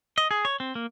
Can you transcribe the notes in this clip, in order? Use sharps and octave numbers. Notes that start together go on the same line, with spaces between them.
D#5
G#4
C#5
C4
A#3